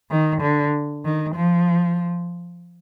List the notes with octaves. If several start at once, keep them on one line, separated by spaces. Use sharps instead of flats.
D#3
D3
D#3
F3